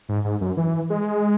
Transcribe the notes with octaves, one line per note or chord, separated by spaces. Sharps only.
G#2
G#2
F#2
E3
G#3